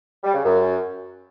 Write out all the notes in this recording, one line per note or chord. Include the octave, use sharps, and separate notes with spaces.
G3
C#3
F#2